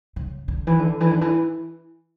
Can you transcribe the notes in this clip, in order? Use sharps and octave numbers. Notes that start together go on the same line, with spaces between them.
C#3
D3
E3
D3
E3
D3
E3